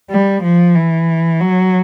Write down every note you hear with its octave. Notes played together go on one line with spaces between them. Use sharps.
G3
F3
E3
F#3